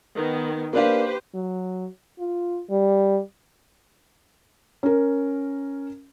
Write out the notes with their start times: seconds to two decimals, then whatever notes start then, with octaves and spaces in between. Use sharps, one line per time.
0.14 D#3 B3
0.73 A#3 D4 G4 B4 C5 F5
1.34 F#3
2.19 F4
2.70 G3
4.83 C#4 A#4